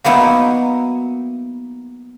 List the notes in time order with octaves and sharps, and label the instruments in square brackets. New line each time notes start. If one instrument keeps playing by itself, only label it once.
[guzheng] F#3 A#3 B3 D#4 E4